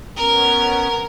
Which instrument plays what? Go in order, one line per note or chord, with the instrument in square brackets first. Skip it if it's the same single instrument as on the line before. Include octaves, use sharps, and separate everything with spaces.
[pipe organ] B3 C#4 [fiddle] A#4